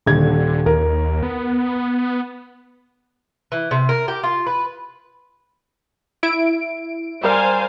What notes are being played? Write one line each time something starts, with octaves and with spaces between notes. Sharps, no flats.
D#1 D3 G#6
D#2 A#4
B3
E3
C3
A#4
G4
F4
B4
E4 D7
G3 A#4 C5 F5 G#5 F6